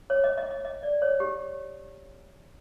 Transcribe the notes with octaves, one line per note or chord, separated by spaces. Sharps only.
C#5
D#5
D#5
D#5
D#5
D5
C#5
G4